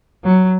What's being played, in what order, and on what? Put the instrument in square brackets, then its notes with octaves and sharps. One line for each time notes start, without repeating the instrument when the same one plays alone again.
[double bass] F#3